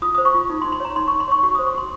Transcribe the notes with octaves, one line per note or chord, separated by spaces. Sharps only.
F4 D#6
D#6
C5
C#6
F4
D#4
C6
D#4
C6
C#5 A#5
D#4 C6
C#6
D#4
C6
C#5 C#6
F#4 C#6
D#6
C5
C#6
F#4 C6